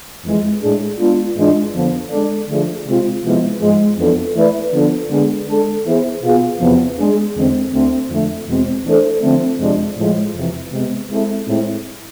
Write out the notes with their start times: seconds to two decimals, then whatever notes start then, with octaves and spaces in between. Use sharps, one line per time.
0.24 F2 E3 G#3
0.61 A2 G#3 D4 G#4
0.98 G#3 B3 D4 F4
1.36 G#2 E3 G#3 D4 F4
1.74 F2 D3 F3 B3
2.11 G#3 D4 A4 D5
2.48 D3 F3 A3 D4 G#4
2.86 C3 G#3 C4 F4
3.23 C3 F3 G#3 B3 E4
3.60 G#2 F3 G#3
3.98 F2 E3 B3 D4 A4
4.35 E3 A3 E4 B4 D5
4.73 D3 F3 B3 D4 A4
5.10 D3 G#3 B3 D4 G#4
5.48 G#3 D4 A4
5.86 E3 B3 E4 G#4 C5
6.22 B2 B3 F4 G#4
6.60 E2 C3 F3 B3
6.98 G#3 D4 G#4
7.35 E2 D3 G#3 C4
7.72 D2 D3 A3 C4
8.09 F2 D3 A3
8.47 E2 B2 G#3 C4
8.85 E3 A3 D4 A4 C5
9.22 D3 F3 A3 C4
9.59 F2 C3 G#3 D4
9.97 A2 F3 G#3
10.35 F2 C3 E3
10.71 C3 G#3 B3
11.10 G#3 C4 E4 A4
11.46 A2 G#3 C4 E4